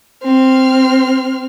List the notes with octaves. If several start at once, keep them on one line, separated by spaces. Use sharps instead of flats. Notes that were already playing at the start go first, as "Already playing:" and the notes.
C4 F6